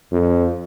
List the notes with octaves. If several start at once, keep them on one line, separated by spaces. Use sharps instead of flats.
F2